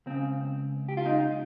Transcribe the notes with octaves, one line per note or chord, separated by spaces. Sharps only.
C#2 C#3 C4
G4
F4
D#4